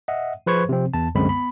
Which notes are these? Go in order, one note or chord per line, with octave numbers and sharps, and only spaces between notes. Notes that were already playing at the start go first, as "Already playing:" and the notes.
D#5 E5 F#5
F3 G#4 B4 C5 C#6 G#6
C3 F3 C4
E2 A5
C2 F#2 D3 G#3 C4 B5
B3 B5